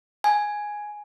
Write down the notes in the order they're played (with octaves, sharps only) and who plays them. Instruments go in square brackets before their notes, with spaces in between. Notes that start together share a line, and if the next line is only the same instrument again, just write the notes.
[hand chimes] G#5